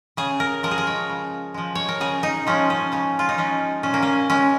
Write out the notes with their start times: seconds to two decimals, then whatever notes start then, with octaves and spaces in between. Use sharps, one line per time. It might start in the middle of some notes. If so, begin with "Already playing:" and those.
0.17 C#3 G#4
0.40 A#4
0.63 F3 G#3 A#4
0.71 G#4
0.78 A#4
0.87 C#5
1.10 C#3
1.54 F3 G#3
1.75 C#5
1.89 A#4
2.00 C#3 G#4
2.23 D#4
2.47 F3 G#3 C#4
2.70 C#4
2.92 C#3 C#4
3.19 F4
3.29 D#4
3.38 F3 G#3 C#4
3.83 A#2 C#4
3.94 A#3
4.02 C#4
4.30 G#3 C#4